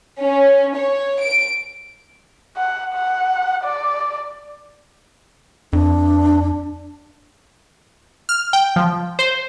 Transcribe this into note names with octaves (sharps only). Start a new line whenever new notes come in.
C#4
C#5
D7
F#5
F#5
D5
F2 D4
F6
G5
F3
C5